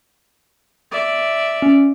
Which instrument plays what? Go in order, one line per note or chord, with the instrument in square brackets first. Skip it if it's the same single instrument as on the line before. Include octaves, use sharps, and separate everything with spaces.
[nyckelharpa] D5 E5
[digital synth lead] C#4